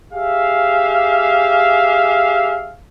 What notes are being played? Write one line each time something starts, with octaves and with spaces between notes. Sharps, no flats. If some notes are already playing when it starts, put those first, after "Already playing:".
G4 G#4 E5 F5